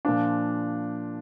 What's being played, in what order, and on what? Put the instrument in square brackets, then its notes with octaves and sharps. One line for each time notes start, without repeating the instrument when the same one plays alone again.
[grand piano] A#2 F3 D4